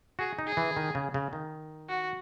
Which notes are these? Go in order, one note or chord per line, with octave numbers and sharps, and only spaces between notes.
F#4 G#4
D#4
G#4
E3
D#3
C#3
C#3
D#3
F#4